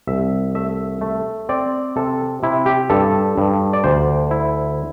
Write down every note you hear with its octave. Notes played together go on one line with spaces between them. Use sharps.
C2 E5
A3 E5
A3
C4 D5
C3 A4
C3 E4
G4
G2 A4
G2
D5
D2 C5
E4